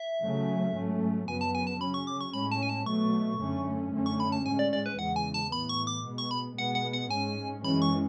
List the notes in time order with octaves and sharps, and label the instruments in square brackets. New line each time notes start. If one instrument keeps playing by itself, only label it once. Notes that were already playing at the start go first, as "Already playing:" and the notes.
Already playing: [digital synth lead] E5
[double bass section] C#3 F#3 A3 C#4
G#2 F#3 A3 C#4
[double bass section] F#2 C#3 F#3 B3 [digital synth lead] G#5
[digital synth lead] A5
G#5
A5
[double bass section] C#3 F#3 C#4 [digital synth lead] B5
[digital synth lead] C#6
D6
C#6
[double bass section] A2 G#3 C#4 [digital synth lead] B5
[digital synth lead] A5
G#5
A5
[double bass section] B2 F#3 A3 [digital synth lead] C#6
[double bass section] F#2 D3 A3 C#4
F#2 D3 A3 C#4
[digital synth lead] C#6
B5
A5
[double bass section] A2 G#3 C#4 [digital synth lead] G#5
[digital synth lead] D5
D5
B4
[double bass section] E2 C#3 E3 G#3 [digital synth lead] F#5
[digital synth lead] G#5
A5
[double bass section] A2 E3 B3 [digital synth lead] B5
[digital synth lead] C#6
D6
[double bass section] B2 G#3 B3
[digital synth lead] C#6
B5
[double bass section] B2 G#3 B3 [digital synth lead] F#5
[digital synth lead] F#5
F#5
[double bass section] G#2 G#3 C#4 [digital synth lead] G#5
[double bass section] F#2 E3 G#3 C#4 [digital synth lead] B5
[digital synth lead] C#6